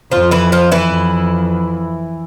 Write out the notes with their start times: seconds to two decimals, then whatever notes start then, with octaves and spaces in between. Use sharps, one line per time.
0.12 F2 F3 F4
0.31 E3 E4
0.52 F3 F4
0.72 E3 E4
0.92 F2